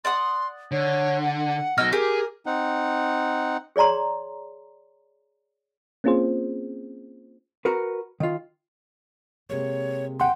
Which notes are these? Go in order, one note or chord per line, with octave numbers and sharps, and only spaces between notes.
D5 F#5 C6 D#6
D3 C#5
F#5
B2 F#3 D#5 E6 F6
G4 G#4 A#4
C4 D#4 F#5
G#4 C#5 D5 A#5 C6
A#3 C4 C#4 F4 G#4 C5
F#4 A#4 B4
D#3 F4
C3 G#3 A#3 C#5
F#5 G5 C6